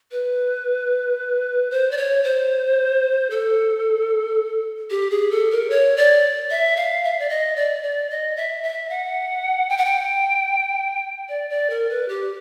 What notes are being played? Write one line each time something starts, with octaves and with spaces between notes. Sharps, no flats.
B4
C5
D5
C#5
C5
A4
G4
G#4
A4
A#4
C#5
D5
E5
F5
E5
D5
D#5
D5
D5
D#5
E5
E5
F#5
G5
F#5
G5
D5
D5
A#4
B4
G4